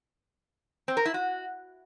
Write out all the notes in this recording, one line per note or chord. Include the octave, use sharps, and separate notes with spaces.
C4
A#4
E4
F#4